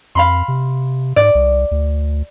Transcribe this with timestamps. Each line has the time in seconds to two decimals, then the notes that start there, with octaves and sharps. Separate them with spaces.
0.15 F2 F5 B5 C6
0.48 C3
1.16 G#2 D5
1.35 C2
1.71 D2